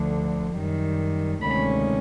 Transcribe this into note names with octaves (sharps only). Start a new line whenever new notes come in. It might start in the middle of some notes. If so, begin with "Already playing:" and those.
Already playing: D2 D3 F3
F#2 D#3 G3
D2 C3 D#3 G#3 C#4 B5